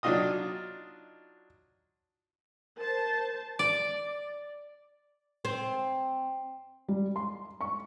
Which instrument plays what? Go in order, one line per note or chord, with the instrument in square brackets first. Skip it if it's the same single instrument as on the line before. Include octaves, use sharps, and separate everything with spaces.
[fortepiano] F#3 D4 D#4 F4 D#5 D#6
[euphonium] A#4 [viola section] C5 A5
[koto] D5
[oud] C4
[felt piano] G3
C6
C#6